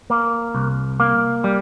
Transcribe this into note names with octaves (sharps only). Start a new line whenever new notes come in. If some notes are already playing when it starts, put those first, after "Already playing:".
A#3
C2
A#3
G3